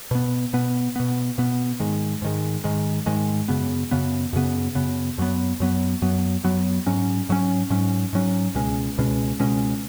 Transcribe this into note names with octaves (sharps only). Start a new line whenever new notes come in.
B2 B3
B2 B3
B2 B3
B2 B3
G#2 D#3 G#3
G#2 D#3 G#3
G#2 D#3 G#3
G#2 D#3 G#3
F#2 C#3 B3
F#2 C#3 B3
F#2 C#3 B3
F#2 C#3 B3
F#2 F#3 B3
F#2 F#3 B3
F#2 F#3 B3
F#2 F#3 B3
G#2 F#3 C#4
G#2 F#3 C#4
G#2 F#3 C#4
G#2 F#3 C#4
C#2 B2 G#3 C#4
C#2 B2 G#3 C#4
C#2 B2 G#3 C#4